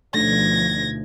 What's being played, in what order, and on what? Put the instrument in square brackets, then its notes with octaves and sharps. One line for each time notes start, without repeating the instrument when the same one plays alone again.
[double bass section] D2 B2 F3 [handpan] A3 D4 D#4 [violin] G#6 A#6